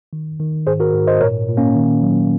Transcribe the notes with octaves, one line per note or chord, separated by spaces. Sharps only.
D#3
D#3
G#2 G#4 C5
F#4 A#4
G#2
C5 D#5
A#2 A#4 C#5
A#2
A#3 C#4
D#3
F#3